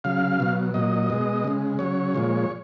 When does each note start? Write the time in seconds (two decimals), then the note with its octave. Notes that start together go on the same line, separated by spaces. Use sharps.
0.04 C#3 F#3 F5
0.40 B2 F#3
0.74 A#2 F#3 D#5
1.10 B2 G#3
1.44 C#3 G#3
1.79 C#3 F#3 C#5
2.15 A#2 F3 G#3